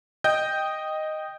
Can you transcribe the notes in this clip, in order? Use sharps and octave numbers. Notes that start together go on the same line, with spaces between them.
D#5 G5 G6